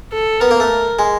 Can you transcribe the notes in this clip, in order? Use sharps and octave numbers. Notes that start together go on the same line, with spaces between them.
A4
B3 A#4
A#3
A3
G#3